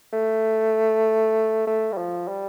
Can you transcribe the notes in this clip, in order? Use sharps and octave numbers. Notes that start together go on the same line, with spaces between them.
A3
A3
G3
F3
G3